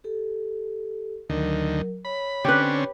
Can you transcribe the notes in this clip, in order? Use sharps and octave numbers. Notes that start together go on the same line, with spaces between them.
G4 A4
D2 D#3 F#3 A#4
C#5 B5
D3 C4 C#4 G4 B4